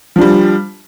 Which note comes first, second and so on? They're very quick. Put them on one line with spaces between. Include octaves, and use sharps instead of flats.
F3 D4 G3